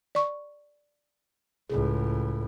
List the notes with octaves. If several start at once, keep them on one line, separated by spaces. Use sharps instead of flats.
D5 C#6
C#2 A2 G#4